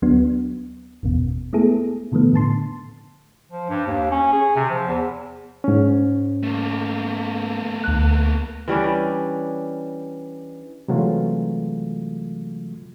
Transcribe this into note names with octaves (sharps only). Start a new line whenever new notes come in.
D2 F#3 B3 D4 F#4
G1 E2 B2
G#3 A3 B3 E4 G#4 A4
B2 D#3 F3 A3 B3
A2 D3 A5 C6
F3
G2
D#2
C#4
G#4
C3
F3
E2
G#2 C#4
A3 A#3
D2 F#6
E3 G3 C#4 D4
C3 E3 F#3 G#3 A3 F4